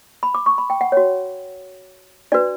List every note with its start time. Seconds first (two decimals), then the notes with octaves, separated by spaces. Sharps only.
0.23 B5
0.35 D6
0.46 C#6
0.58 B5
0.70 G5
0.81 F#5
0.92 F#4 C#5
2.32 D4 F#4 B4 D5